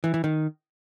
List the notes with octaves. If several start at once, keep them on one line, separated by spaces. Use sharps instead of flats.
E3
E3
D#3